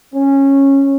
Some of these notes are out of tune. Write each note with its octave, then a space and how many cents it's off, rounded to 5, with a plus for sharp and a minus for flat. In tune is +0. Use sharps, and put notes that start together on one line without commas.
C#4 -15